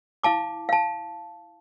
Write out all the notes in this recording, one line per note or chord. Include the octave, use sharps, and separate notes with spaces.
E4 F5 A5 D6
F5 A5